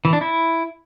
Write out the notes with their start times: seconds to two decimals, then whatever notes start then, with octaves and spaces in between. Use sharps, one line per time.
0.05 E3
0.13 D4
0.21 E4